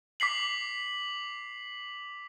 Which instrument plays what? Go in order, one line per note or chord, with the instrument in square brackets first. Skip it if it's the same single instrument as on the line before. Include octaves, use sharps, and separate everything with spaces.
[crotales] D6 B6 C7 F#7